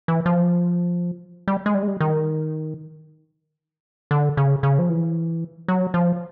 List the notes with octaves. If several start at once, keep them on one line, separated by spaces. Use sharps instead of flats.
E3
F3
G3
G#3
G3
G#3
G3
D#3
D3
C#3
C#3
F3
E3
F#3
F3